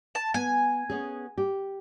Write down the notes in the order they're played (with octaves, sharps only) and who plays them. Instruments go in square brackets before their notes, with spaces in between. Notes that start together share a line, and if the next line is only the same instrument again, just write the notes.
[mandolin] A5
[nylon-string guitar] B3 [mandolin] G#5
[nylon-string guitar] B3 C#4 G#4
G4